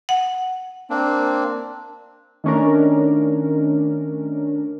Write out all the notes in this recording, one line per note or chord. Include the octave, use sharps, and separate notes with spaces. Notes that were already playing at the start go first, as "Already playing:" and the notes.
F#5
A#3 C4 D4
D#3 A3 C#4 D4 A#4